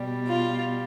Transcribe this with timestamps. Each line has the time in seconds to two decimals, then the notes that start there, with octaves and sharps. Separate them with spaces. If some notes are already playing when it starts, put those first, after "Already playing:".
Already playing: B2 G3
0.27 F4